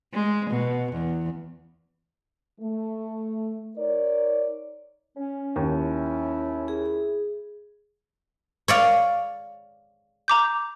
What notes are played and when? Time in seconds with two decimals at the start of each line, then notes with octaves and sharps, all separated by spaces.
0.13 G#3
0.50 B2
0.93 E2
2.61 A3
3.77 D#4 A#4 C#5 D5
5.17 C#4
5.56 D#2 E4
6.68 G#4
8.68 C#5 D5 F5
10.28 A#5 D6 G6